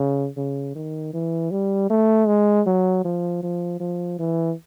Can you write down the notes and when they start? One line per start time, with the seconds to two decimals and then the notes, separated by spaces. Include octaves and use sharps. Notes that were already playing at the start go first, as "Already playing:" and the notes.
Already playing: C#3
0.37 C#3
0.75 D#3
1.13 E3
1.51 G3
1.90 A3
2.27 G#3
2.67 F#3
3.05 F3
3.43 F3
3.80 F3
4.19 E3